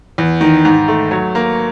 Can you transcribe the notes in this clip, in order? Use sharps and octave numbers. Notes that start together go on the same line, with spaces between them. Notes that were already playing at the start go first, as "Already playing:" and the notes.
E2
D#3
G#2
A3
F#3
A#3